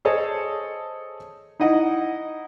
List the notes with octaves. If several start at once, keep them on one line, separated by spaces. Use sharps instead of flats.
G#4 A4 C5 C#5 D#5 A5
D#4 E4 D#5 F#5